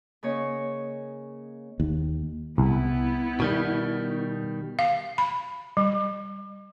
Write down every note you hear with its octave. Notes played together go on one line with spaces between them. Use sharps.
C#3 A#3 C#5 D#5
D#2
C2 B3 E4
B2 D#3 G3
F5
B5
G3